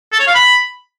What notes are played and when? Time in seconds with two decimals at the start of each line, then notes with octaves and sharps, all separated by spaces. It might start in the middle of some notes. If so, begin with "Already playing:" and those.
0.13 A4
0.20 C#5
0.27 F5
0.35 B5